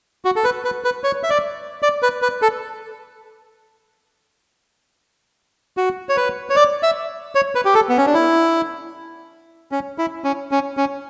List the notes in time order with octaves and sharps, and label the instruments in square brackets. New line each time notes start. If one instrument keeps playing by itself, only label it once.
[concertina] F#4
A4
B4
B4
B4
C#5
E5
D5
D5
B4
B4
A4
F#4
C#5
B4
C#5
D5
E5
C#5
B4
G4
A4
B3
C#4
D4
E4
C#4
E4
C#4
C#4
C#4